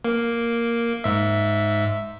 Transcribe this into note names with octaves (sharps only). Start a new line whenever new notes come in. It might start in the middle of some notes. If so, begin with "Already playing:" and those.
A#3
G#2 E5